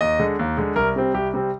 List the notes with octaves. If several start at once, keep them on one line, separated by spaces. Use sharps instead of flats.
D#2 D#5
D3 G#3
D#2
D3 G#3
C2 A#4
C3 G3 C4
C2 G4
C3 G3 C4